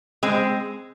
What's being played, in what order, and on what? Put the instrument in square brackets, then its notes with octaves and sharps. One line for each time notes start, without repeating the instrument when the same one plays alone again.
[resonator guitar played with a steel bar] G#3 C4